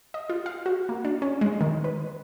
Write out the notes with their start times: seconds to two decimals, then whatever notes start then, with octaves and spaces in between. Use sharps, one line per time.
0.14 D#5
0.30 F4
0.46 F5
0.66 F#4
0.89 A#3
1.05 D4
1.22 C#4
1.41 G#3
1.61 D#3
1.84 B4